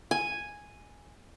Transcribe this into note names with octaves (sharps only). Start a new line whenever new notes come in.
G#5